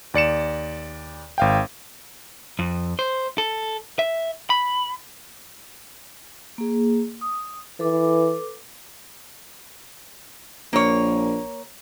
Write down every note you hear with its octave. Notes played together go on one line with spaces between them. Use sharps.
D#2 D5 C#7 E7
G#1 F5 G5
F2
C5
A4
E5
B5
A#3 G#4
D#6
E3 A4 B4 D6
A#1 A#3 C#5